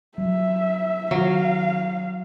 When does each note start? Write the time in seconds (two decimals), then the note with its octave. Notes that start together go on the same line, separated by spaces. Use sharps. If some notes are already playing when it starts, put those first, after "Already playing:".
0.18 F#3 E5
1.11 D#3 F#3 F5